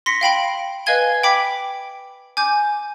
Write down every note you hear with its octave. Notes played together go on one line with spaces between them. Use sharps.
C6 A#6 B6 C#7
F5 G5 B5 D7
B4 D#5 F5 G#5 G#6 G7
G5 B5 D6 B6
G#5 D6 G6